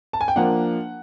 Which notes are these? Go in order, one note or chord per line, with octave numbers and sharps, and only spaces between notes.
A5
G#5
G5
F3 A#3 D4 F#5